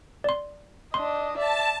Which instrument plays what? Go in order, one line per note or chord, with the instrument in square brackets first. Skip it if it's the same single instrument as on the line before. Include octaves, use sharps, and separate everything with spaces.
[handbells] D5 C6
[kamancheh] D4 D#5 [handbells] C6
[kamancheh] D5 E5 [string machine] A5